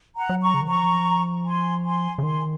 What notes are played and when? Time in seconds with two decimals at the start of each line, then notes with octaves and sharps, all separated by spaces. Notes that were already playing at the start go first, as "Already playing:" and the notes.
0.16 F#5 A#5
0.29 F#3
0.42 A#5 C#6
0.54 C#3
0.61 D#3
0.67 F3 A#5 C#6
1.46 G#5 C6
1.85 G#5 C6
2.18 C#3
2.23 D#3 G#5 C6